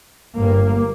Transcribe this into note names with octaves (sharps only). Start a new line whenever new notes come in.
G1 G2 A#3